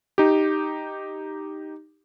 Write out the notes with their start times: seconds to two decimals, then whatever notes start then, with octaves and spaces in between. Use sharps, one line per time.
0.18 D#4 G4